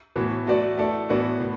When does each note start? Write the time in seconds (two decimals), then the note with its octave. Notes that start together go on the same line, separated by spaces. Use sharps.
0.16 A2 E3 B3 F#4
0.47 F#3 A3 F#4 B4 D5
0.78 A3 E4 A4 D5
1.09 A2 E3 B3 F#4 D5
1.40 A2